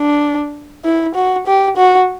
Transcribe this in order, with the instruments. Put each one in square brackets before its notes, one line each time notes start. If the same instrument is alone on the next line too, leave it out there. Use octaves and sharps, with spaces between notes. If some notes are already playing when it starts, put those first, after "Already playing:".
Already playing: [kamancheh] D4
E4
F#4
G4
F#4